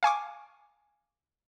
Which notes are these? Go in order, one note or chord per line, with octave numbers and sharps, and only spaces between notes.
F5 G#5 C#6 D6